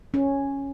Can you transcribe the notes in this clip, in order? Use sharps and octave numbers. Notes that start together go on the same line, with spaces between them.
C#4